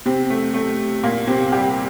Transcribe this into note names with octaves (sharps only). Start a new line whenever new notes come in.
C3 C4
A3
A3
A#2 A#3
C3 C4
G3 G4